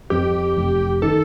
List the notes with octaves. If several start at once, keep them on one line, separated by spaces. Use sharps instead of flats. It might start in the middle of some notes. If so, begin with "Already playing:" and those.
F2 G4
F1
D#3 A4